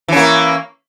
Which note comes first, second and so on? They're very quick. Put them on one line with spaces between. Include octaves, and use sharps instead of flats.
E3 C#4 A#3